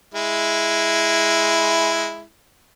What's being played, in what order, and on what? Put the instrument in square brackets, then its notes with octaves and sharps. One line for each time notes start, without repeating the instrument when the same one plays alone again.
[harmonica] G#3 E4